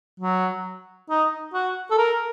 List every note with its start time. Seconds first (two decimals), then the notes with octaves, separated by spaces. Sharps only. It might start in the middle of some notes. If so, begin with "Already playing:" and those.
0.20 F#3
1.10 D#4
1.54 F#4
1.91 A4
1.98 A#4